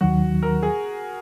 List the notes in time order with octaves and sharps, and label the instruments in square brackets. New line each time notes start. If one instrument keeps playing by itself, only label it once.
[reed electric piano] D#2 D#3 F#3 [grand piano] F#4
[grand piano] A#4
G#4